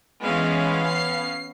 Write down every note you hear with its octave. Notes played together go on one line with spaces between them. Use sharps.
E3 G#3 B3 C#4 F5
C7